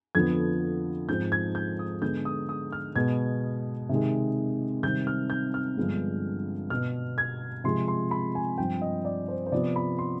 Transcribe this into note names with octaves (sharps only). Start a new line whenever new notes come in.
F2 D3 F3 B3 G#6
G#2 F3 G#3 C4 G6
G#6
G6
D#6
D3 G#3 B3 G6
D#6
D#6
F6
B2 G#3 B3 G#6
C3 D#3 G#3
C3 D#3 G3 C4 G6
F6
G6
F6
G2 D3 F3 G#3 B3
B2 B3 F6
G#6
C3 F3 G#3 C6
C6
B5
G#5
G2 F3 C4 G5
D#5
D5
C5
C5
C3 F3 B3 D5
B5
C6